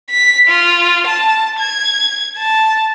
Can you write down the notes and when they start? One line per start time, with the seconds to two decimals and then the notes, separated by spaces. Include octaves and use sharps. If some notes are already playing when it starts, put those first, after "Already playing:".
0.10 B6
0.48 F4
1.07 A5
1.59 G#6
2.37 A5